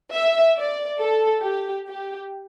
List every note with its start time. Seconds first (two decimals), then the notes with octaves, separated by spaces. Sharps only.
0.14 E5
0.57 D5
1.00 A4
1.43 G4
1.87 G4